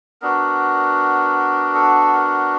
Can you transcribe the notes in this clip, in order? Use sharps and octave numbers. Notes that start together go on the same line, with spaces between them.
B3 D4 F#4 A#4
A4
A#4